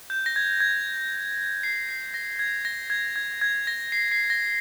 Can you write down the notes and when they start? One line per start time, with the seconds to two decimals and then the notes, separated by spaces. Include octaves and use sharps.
0.10 G6
0.26 A#6
0.36 G#6
0.60 G#6
1.63 C7
1.89 C7
2.14 A#6
2.39 G#6
2.65 A#6
2.90 G#6
3.16 G#6
3.41 G#6
3.67 A#6
3.92 C7
4.12 C7
4.30 A#6